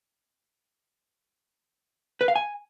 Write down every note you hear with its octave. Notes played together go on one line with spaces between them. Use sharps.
B4
F5
G#5